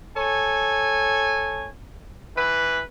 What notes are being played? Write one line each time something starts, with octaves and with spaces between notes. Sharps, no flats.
A4 C#5 G#5
E3 B4